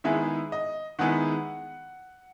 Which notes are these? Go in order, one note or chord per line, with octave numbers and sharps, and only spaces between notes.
D#3 G#3 B3 E4 G#4 E5
D#5
D#3 G#3 B3 E4 G#4 F#5